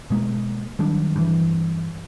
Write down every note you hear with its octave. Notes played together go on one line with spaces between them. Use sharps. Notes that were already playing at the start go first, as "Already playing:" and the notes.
B2 G#3 A#3
D#3 F#3 G3 D4
G2 E3